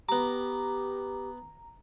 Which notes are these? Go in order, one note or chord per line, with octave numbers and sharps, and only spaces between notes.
B3 G4 A#5 D6